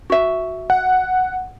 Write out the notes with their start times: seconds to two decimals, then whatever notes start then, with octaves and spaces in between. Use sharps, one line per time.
0.10 F#4 E5
0.70 F#5